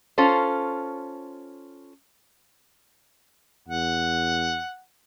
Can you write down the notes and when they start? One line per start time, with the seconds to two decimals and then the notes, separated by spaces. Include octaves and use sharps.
0.18 C#4 F4 A4 C5
3.68 E2 F#5